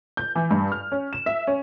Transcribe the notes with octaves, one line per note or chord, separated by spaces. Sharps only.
G6
E3
G2
F6
C#4
E7
E5
C#4